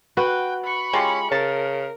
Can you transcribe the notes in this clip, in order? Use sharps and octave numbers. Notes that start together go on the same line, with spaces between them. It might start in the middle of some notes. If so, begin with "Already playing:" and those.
F#4 B4 G5
B5 C#6
G#3 C#4 F4 G4
C#3 A#4 A5